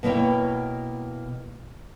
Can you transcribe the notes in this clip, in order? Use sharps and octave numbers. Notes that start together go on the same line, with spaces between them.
B2 A#3 E4 C#5 G5